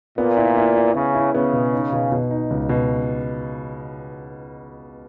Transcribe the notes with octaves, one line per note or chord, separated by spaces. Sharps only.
A#2 B3
E4
E4
E4
C#3 B3
E4
C#3 B3
B2
D#4
B2
B2
D#4
C#2
B2